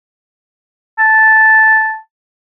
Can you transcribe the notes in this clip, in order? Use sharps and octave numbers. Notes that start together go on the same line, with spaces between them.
A5